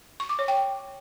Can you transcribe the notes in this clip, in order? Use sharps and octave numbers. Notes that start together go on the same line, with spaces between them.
C#6
D6
C#5
G5